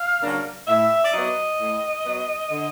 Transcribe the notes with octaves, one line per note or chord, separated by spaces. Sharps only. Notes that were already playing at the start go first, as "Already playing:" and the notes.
Already playing: F5
C#3 F#3 A#3 D4
A2 E5
D5
F#3 B3 D#5
A2
F#3 B3
D3